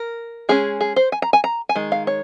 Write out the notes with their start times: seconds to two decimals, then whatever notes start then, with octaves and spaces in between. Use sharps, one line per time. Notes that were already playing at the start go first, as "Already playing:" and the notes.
Already playing: A#4
0.49 G#3 C#4 G#4
0.81 G#4
0.96 C5
1.12 G#5
1.22 A#5
1.33 G#5
1.44 A#5
1.69 G#5
1.75 D#3 G#3
1.92 F5
2.07 C#5